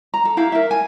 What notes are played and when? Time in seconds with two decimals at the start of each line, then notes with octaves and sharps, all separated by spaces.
0.14 A#5
0.25 A4
0.37 E4 G4 F5 A#5
0.52 A#4 E5
0.71 G#5